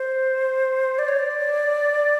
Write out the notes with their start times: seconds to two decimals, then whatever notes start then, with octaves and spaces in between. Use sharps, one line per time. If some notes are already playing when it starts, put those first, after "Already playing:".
Already playing: C5
0.99 D5
1.08 C#5
1.19 D5